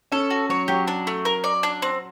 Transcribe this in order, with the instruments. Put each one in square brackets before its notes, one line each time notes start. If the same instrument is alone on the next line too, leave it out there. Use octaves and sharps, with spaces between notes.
[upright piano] C#4 [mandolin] A4
[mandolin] F#4
[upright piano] F#3 [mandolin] C#5
[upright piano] F#3 [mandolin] G4
[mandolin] D4
A3
A#4
D5
D4
C4